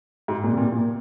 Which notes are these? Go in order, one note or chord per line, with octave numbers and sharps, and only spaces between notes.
G#2
A#2
C3
A#2
A#2